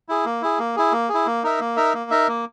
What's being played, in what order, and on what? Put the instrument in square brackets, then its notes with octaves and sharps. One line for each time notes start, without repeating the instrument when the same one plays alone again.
[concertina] E4 G#4
A#3
E4 G#4
A#3
E4 G#4
A#3
E4 G#4
A#3
D#4 A#4 E5
A#3
D#4 A#4 E5
A#3
D#4 A#4 E5
A#3